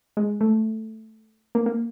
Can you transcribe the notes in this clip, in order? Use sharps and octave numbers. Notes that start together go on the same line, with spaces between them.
G#3
A3
A#3
A#3